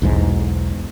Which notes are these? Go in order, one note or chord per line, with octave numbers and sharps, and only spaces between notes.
B1 E2 G#2